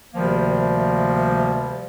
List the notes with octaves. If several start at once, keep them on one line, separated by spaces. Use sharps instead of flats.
D2 C3 D#3 F3 G3 A#3